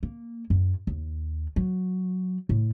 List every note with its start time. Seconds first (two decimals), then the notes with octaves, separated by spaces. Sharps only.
0.03 A#3
0.50 F#2
0.87 D#2
1.56 F#3
2.49 A2